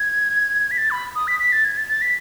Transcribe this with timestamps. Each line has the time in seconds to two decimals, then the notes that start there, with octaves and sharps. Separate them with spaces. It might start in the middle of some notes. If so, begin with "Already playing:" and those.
Already playing: G#6
0.71 B6
0.78 A6
0.91 B5
1.15 D#6
1.27 B6
1.39 B6
1.52 A6
1.65 G#6
1.77 A6
1.89 A6
2.01 B6